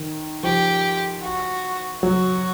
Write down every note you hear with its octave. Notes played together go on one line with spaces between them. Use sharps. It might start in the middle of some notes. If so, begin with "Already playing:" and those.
Already playing: D#3
F3 G4
F#4
F#3 F#4